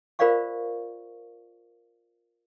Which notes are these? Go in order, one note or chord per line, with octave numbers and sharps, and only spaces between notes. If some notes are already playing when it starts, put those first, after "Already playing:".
F4 A#4 C5 D5 F5 C#6